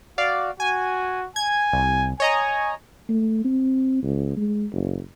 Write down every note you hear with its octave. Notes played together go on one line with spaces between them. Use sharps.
F#4 D5 F5
F#4 G#5
G#5 G#6
C2
C#5 D#5 G#5 A#5
A3
C4
C#2
G#3
F#1